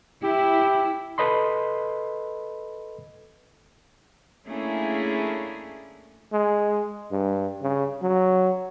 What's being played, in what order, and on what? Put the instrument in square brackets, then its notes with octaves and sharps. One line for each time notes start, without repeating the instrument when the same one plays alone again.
[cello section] E4 [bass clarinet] G4
[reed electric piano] A4 B4 D#5 B5 C6
[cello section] A3 A#3 C#4 D4 E4 G#4
[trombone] G#3
G2
C#3
F#3